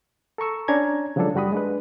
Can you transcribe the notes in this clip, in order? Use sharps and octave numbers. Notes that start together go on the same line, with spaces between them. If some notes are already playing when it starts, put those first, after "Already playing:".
A4 A#5 C#6 E6
C#4 D4 A#5 G#6
C#3 F3 F#3 G#3 D4 A4
F#2 G3 F#4 B5 D#6
G#3 D4 B4